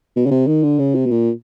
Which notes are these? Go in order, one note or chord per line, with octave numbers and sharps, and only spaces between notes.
B2
C#3
C3
D#3
D3
C#3
C3
B2
A#2